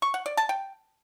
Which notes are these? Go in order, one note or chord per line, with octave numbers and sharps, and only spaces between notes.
C#6
F#5
D5
A5
G5